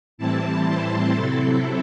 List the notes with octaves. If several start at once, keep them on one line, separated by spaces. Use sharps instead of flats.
A2 E3 G3 C4 E4 A5
C5
C3 F#3 C4 E4 A4